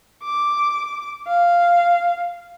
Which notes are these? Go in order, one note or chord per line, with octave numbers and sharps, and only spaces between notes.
D6
F5